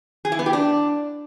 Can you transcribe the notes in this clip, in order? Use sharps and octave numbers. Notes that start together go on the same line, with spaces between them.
G#4
E4
B3
G4
D4